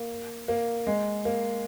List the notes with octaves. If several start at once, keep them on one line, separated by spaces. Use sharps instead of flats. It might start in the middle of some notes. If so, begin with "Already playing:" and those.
Already playing: A#3
A#3
G#3
A#3